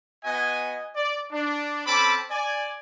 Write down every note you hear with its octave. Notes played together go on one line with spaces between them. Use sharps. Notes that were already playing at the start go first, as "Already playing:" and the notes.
B3 F#4 D#5 G#5
D5
D4
C4 C#4 A4 A5 B5 D6
D5 G#5